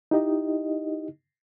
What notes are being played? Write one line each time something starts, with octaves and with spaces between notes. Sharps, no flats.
D#4 E4 G4 D#5